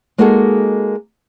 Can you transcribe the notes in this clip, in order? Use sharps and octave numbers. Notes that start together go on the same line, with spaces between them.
G#3 A#3 D#4 F#4 G#4 A4